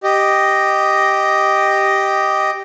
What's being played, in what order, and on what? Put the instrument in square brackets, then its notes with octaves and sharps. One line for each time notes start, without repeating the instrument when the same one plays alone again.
[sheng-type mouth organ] G4 D#5